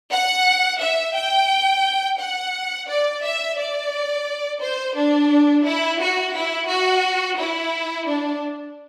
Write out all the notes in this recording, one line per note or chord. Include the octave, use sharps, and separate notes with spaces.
F#5
E5
G5
F#5
D5
E5
D5
C5
D4
E4
F#4
E4
F#4
E4
D4